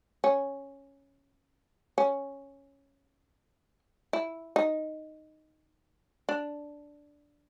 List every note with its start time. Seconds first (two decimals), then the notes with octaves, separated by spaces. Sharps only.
0.24 C#4
1.98 C#4
4.13 E4
4.56 D#4
6.29 D4